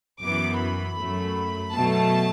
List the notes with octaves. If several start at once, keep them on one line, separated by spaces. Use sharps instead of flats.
F#2 E3 B3 D6
B5
F#2 F#3 A3
B2 F#3 A3 A5